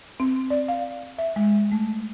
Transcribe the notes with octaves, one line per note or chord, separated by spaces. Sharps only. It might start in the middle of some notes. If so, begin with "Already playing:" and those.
C4
D5
F5
E5
G#3
A3